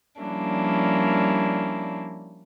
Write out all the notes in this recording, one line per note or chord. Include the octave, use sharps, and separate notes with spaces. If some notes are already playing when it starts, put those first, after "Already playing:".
F3 G3 A#3 C#4 D4 E4